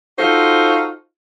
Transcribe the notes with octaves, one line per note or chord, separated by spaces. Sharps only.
D#4 F4 F#4 A4 C5